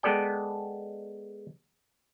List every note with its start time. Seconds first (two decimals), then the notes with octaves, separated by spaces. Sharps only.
0.03 G#3 B3 A4 D5 G5